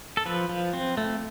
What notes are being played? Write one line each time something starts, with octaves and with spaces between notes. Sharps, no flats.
A4
F3 B4
F3
C4
A3